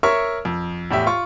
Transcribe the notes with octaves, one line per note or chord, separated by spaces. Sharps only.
A#4 C#5 E5 C#6 E6 F6
F2
E2 A2 G4 E5
F4 C#6